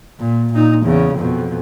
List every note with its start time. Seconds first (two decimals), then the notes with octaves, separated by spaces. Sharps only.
0.20 A#2
0.54 A#2 D#4
0.84 E2 C#3
1.16 F2 B2